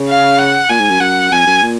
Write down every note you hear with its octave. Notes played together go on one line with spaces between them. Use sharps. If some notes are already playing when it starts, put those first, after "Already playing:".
Already playing: C#3
F5
F#5
A#2 G#5
G#2
F#2
F#2 F#5
F2 G#5
F#2
A#2